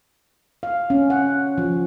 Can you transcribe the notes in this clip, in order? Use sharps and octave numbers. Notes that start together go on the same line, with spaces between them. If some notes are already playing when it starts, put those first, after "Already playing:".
F5
C#4
F#5
F3